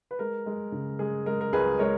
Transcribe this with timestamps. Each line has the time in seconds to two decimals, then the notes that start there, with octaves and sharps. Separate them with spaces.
0.11 B4
0.19 G#3 A#4
0.46 G#3
0.72 C#3
0.99 G#3 G#4
1.26 G#3 A#4
1.41 A#4
1.53 C#2 G#4 B4
1.79 G#3 A#4 C#5